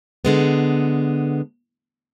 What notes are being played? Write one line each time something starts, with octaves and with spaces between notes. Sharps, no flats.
D3 G#3 B3